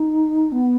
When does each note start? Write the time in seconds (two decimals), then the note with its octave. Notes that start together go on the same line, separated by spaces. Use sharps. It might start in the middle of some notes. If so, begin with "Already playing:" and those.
Already playing: D#4
0.52 B3